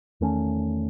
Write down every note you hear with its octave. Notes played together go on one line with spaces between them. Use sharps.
E2 D#3 A3 C#4